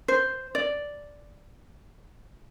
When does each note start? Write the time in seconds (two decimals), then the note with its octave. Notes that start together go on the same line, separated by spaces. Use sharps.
0.08 C5
0.55 D5